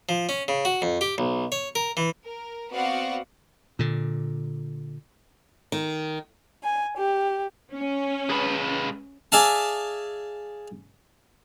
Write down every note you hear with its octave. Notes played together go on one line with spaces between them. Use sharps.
F3
C#4
C#3
F#4
F2
G4
B1
C#5
A#4
E3
A#4
B3 C4 F#4 D5 F5 F#5
A#2 D3
D#3
G#5
G4
C#4
G#3 B4
G#4 D5 E5 F5 A5